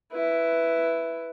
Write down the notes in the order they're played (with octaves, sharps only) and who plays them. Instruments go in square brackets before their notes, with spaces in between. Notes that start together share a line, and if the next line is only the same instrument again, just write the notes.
[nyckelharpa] E4 B4